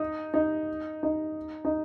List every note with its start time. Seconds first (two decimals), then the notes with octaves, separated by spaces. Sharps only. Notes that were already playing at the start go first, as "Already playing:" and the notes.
Already playing: D#4
0.34 D#4
1.03 D#4
1.65 D#4